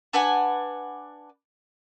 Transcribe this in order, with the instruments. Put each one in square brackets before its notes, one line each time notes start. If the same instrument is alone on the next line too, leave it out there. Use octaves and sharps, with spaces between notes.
[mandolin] D4 B4 F#5 G#5